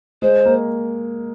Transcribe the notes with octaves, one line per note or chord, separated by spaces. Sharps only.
G#3 C5
A#3